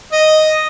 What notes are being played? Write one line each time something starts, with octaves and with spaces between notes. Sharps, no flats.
D#5